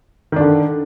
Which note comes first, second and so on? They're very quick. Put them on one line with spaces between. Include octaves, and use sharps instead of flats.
D#3 D4 D3